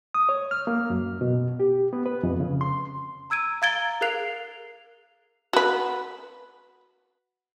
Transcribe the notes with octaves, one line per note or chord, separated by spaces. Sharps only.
D#6
C#5
F6
A#3
F#2
B2
G4
B3
B4
F2
C#3
C6
A#5 E6 G#6 D7 D#7
F5 A#5 G#6 A6 D7 G7
G#4 A#4 F5 F#6 C7 F7
F#4 B4